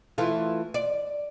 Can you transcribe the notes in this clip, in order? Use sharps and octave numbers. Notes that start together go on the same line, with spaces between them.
E3 A3 F4
D5